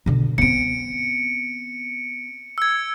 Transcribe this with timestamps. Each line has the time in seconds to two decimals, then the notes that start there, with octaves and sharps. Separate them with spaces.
0.06 B2 D3
0.38 B3 C4 C#7 D7
2.58 E6 G#6